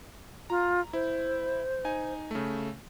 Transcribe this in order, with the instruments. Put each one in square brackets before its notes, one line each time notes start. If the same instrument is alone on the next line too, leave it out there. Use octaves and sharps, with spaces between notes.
[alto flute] F4 [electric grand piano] A#5
[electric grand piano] E4 [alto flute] C5
[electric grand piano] D#4 G#5
C#3 A3